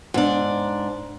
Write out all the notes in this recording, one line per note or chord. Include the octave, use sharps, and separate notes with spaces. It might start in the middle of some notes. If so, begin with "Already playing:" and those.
G#2 D4